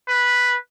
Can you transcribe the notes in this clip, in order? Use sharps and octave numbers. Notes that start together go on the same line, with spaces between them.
B4